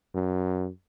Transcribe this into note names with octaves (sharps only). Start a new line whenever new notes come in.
F#2